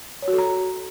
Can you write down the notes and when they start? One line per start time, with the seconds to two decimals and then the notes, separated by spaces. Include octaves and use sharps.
0.22 C#5
0.28 F#4
0.33 A4
0.38 A#5